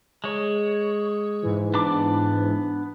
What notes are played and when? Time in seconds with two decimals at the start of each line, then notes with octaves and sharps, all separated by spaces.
0.24 G#3 C#5
1.43 G#2 E3
1.74 B3 D4 D6